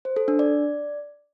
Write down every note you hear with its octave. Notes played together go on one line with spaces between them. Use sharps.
C5
A4
D4
D5